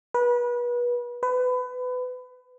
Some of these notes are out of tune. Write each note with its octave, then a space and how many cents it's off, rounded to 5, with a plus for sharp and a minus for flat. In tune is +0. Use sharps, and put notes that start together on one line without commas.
B4 -30
B4 +25